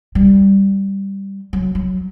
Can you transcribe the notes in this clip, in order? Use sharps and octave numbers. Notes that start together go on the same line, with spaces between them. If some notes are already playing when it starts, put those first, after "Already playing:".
G3
F#3
F#3